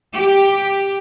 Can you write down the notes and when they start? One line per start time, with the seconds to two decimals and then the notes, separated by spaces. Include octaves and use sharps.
0.15 G4